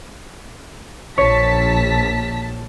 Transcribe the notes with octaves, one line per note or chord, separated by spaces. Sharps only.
A#1 C#5 A5 B6